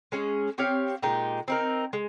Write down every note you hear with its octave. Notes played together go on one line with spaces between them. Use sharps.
G#3 C#4 G#4
C4 G4 C#5 F5
A#2 G#3 D#4 G4
C4 D#4 A#4
G#3